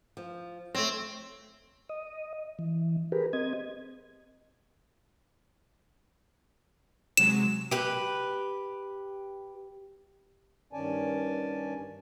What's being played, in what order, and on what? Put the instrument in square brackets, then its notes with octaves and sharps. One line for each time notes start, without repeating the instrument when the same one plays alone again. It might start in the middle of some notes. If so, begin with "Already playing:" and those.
[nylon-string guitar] F3
[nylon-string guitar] A3 C#5 [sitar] C4
[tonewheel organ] D#5
E3
G4 G#4 A#4 B4
C4 D#5 G#6
[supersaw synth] C3 F#3 G#3 [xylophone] E7
[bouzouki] G4 B4
[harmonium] G2 D#3 C#4 D5 G#5 A5